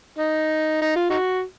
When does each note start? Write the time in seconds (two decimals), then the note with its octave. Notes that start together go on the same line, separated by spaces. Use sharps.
0.19 D#4
0.82 D#4
0.96 F4
1.10 D#4 F#4